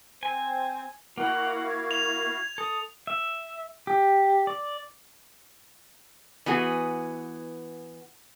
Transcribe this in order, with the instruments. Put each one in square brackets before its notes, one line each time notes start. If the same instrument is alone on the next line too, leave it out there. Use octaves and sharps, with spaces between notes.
[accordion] C4 C5 [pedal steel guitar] G#5
[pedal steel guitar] A#3 [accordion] E4 F#4 F5 [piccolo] F#5
[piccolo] G#6
[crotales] F7
[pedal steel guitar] A4 [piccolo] D#6
[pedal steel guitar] E5
G4
D5
[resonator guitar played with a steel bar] E3 B3 F#4 G#4